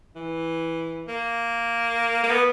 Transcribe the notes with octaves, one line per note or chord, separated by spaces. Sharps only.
E3
A#3
A#3
B3